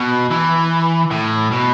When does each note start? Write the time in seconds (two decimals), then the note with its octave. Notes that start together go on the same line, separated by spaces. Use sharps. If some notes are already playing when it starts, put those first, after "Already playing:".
Already playing: B2
0.30 E3
1.11 A2
1.51 B2